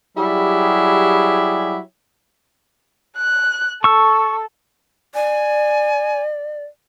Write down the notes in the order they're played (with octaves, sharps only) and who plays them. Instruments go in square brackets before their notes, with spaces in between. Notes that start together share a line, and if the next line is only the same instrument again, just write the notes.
[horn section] F#3 G3 E4 G4 G#4
[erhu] F#6
[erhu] A4 [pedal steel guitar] C#6 E6
[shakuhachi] D5 [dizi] G#5